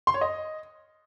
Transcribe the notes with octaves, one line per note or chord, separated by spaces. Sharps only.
C6
C#5
D#5